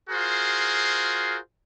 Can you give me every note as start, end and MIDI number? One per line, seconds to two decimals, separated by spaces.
0.10 1.37 65
0.10 1.37 66
0.10 1.37 68
0.10 1.37 70
0.10 1.37 72